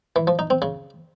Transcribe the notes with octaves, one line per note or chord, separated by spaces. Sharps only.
E3
F3
D#4
C4
C#3